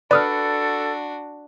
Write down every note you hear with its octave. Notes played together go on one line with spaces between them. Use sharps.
D4 F#4 A4 B4 D5 D#6 F6